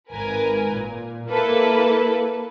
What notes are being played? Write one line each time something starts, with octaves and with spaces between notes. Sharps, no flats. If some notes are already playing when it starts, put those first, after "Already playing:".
G#1 A#4 B4 G#5
A#2
A#3 E4 A4 B4